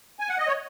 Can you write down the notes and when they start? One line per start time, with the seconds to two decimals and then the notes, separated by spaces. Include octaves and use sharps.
0.19 G#5
0.29 F#5
0.38 D#5
0.47 C#5